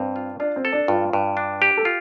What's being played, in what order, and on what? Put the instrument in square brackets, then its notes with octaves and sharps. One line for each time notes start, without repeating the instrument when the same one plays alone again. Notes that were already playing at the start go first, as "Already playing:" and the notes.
Already playing: [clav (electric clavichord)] G2 [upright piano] C4
[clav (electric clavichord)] F4
[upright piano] D4 [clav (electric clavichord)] F4
[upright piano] C4
[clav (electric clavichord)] A4
[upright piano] D4
[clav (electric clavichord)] G2 [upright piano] F4
[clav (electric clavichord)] G2
D4
G4
[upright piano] A4
[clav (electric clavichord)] F4